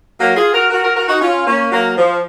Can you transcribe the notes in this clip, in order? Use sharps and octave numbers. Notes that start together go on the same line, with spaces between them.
F#3 A#3
F4 G#4
F#4 A#4
F#4 A#4
F#4 A#4
F#4 A#4
D#4 F#4
C#4 F4
A#3 C#4
F#3 A#3
F3